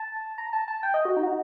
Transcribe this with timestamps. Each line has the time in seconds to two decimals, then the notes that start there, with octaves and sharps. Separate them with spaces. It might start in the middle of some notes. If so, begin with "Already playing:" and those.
Already playing: A5
0.38 A#5
0.53 A5
0.68 A5
0.83 G5
0.94 D#5
1.05 F#4
1.17 D#4
1.23 F#4
1.28 D#4